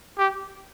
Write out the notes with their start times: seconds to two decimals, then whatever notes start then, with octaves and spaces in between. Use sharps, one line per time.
0.18 G4